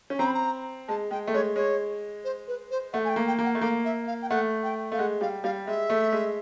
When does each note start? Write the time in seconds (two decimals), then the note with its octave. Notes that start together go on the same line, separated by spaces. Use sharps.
0.10 C#4
0.19 C4 A#5
0.26 B5
0.34 A#5
0.88 G#3 A5
1.11 G#3 G5
1.28 A3
1.34 G#3 C#5
1.56 G#3 C#5
2.24 C5
2.48 B4
2.71 C5
2.93 A3 F#5
3.05 G#5
3.10 G5
3.16 A#3
3.28 G5
3.39 A#3
3.45 F#5
3.55 A3
3.61 A#3 F5
3.85 E5
4.07 F5
4.22 G5
4.29 A3 F#5
4.64 G5
4.92 A3 F5
4.99 G#3 F#5
5.21 G3 F5
5.44 G3 F5
5.67 G#3 E5
5.90 A3
6.12 G#3